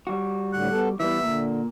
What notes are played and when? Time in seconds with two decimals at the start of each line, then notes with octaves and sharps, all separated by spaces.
0.07 G3 F#4
0.53 D2 A2 D3 F#5
0.71 B3 A4
1.00 E3 G3 B3 E4 E5
1.22 A#2 D3